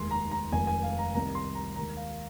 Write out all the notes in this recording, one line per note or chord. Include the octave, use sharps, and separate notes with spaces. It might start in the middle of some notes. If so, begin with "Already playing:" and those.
Already playing: F1 D#2 D#3 G#3 C6
A#5
A#5
F1 F2 D#3 G#3 G#5
G#5
F5
A#5
C2 C3 D#3 A#5
C6
A#5
D#2 D#3 G#3 A#5
F5